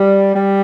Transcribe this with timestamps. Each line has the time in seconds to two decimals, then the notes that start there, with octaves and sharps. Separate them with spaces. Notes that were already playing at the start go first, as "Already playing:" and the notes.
Already playing: G3
0.36 G3